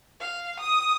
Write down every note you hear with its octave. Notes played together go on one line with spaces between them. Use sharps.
F5
D#6